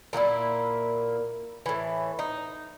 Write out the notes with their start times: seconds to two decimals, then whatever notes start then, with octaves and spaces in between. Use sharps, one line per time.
0.13 A#2 A#3 D4 E4
1.66 A2 E3
2.19 D#4